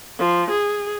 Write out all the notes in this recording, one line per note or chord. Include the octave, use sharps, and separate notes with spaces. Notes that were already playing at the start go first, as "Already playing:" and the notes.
F3
G#4